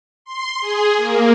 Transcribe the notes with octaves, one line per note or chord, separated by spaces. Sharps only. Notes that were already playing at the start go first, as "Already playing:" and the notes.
C6
G#4
A#3